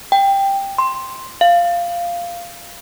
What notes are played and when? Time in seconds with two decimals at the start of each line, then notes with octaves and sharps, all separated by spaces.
0.12 G5
0.78 C6
1.41 F5